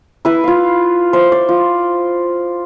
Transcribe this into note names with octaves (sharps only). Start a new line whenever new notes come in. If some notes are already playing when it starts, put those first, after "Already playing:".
E4 B4 E5
F4 F5
C5 E5
D5
F4